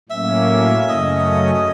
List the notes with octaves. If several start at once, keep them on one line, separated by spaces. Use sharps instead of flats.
A2 F#3 A#3 C#4 E5
F#2 C#3 F#3 A3 C#4 D#5